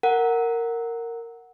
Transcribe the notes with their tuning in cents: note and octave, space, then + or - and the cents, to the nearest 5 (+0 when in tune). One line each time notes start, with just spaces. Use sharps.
A#4 -10 F#5 +0